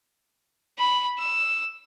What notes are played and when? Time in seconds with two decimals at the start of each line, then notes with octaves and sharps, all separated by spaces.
0.78 B5
1.18 E6